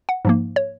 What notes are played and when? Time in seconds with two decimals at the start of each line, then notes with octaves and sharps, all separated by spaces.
0.09 F#5
0.25 G#2 F3 A#3
0.56 C#5